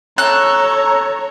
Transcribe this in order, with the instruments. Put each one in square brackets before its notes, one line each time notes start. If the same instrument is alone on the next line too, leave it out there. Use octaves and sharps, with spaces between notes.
[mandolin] A4 F#6 [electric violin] C#5 A#5